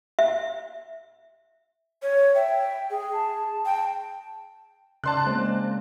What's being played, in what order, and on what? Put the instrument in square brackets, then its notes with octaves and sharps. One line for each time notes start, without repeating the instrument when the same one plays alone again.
[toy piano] E5
[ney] C#5
[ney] E5 [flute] G5
[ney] G#4
[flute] A5
[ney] G5
[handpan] C#3 D5 [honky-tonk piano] A5 C6 F#6
[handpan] G#3 A#3 [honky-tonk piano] C4